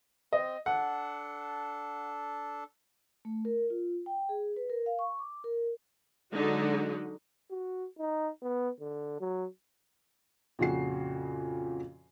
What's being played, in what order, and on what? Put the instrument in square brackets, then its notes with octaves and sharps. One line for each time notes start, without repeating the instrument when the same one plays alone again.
[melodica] C4 [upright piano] D#5
[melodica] D4 A4 [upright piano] F#5
[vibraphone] A3
A#4
F4
G5
G#4
B4
A#4
F5
C#6
D6
A#4
[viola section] D3 F#3 G#3 D#4 F#4
[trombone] F#4
D#4
B3
D3
F#3
[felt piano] F2 A#2 C#3 F#4 C7